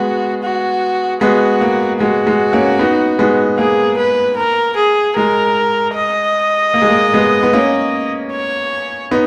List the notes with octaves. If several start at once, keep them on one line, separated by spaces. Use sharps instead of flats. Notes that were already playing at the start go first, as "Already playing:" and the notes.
Already playing: G#3 B3 F#4
F#4
G#3 B3 F#4
A#3
G#3 F#4
G#3
A#3 C#4
B3 D#4
G#3 B3
A#3 G#4
B4
A#4
G#4
G#3 A#4
D#5
A#3
G#3
A#3
G#3 B3
B3
A#3 C#4
C#5
B3 D#4